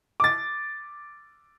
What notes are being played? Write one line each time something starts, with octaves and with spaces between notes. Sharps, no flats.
D6 A6